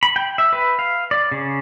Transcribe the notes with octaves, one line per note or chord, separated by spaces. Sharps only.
B5
G5
E5
B4
F5
D5
C#3